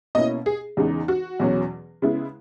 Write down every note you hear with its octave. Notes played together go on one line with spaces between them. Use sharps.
B2 A#3 C#4 E4 D#5
G#4
E2 C#3 G#3 D#4
F#4
E2 B2 F#3 C#4
C#3 G#3 B3 E4